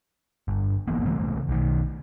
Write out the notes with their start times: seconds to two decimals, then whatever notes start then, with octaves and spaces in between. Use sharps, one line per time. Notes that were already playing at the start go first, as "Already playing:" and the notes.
0.48 G1
0.88 F#1 E3 A#3 B3
1.05 C2 C#3 E3 A3
1.49 B1 D#3